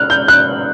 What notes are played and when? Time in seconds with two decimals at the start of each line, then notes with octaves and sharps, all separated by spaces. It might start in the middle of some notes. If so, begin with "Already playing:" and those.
Already playing: F6 F#6
0.10 G6
0.28 F#6